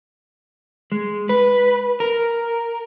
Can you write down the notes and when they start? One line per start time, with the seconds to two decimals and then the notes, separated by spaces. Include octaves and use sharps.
0.92 G#3
1.29 B4
2.00 A#4